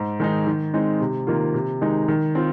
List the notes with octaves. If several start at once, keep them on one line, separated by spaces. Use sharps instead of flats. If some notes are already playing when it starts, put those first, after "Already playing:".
Already playing: G#2
D#3 G#3 D#4
D#3
G#3 C4 D#4
C3
D#3 A#3 F4
C3
D#3 G#3 D#4
D#3
C4 F4